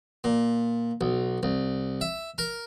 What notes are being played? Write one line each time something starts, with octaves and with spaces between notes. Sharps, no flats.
A#2
B1
C2
E5
A#4